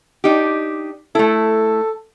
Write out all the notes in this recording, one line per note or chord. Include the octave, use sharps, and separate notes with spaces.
D4 D#4 G4
A3 E4 A4